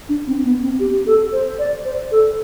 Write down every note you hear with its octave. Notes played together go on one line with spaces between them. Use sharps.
D4
C4
B3
C4
G4
A4
C5
D5
C5
A4